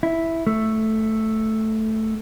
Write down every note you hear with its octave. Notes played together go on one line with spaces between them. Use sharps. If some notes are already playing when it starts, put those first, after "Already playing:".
E4
A3